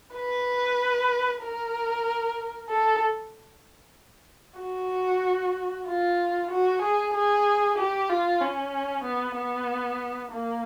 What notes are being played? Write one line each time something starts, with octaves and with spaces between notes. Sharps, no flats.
B4
A#4
A4
F#4
F4
F#4
G#4
G#4
G4
F4
C#4
B3
B3
A#3